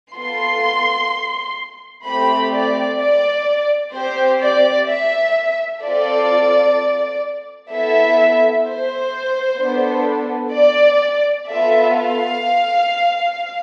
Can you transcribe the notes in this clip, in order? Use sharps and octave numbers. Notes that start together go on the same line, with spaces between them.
B3 F4 A4 C6
A3 C4 G4 B5
D5
D5
C4 G4 C5
D5
E5
C4 F4 A4 D5
B3 E4 A4 E5
C5
B3 D4 A4
D5
B3 F4 A4 E5
F5